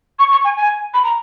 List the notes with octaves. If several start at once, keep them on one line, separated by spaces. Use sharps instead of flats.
C#6
C#6
G#5
G#5
B5
A#5